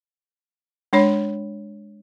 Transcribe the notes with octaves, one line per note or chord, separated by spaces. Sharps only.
G#3 D4 C#5 B5